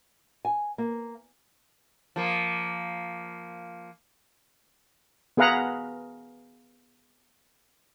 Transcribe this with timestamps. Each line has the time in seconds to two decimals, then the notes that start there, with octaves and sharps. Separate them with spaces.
0.45 G#5
0.78 A#3
2.16 F3 A#3
5.37 B3 G#4 B4 F5 F#5 A#5